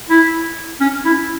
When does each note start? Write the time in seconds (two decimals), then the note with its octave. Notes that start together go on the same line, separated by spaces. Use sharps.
0.10 E4
0.80 C#4
1.05 E4